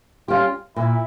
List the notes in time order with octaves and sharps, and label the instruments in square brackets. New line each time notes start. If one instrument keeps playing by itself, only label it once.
[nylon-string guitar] G3 C#4 G4 [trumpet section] F4
[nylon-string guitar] A#2 [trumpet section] E4